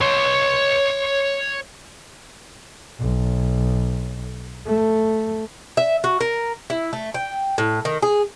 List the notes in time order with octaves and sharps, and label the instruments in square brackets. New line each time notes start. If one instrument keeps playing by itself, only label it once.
[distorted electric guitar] C#5 C6
[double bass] B1
A3
[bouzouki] E5
F#4
A#4
E4
A3
G5
A2
D#3
G#4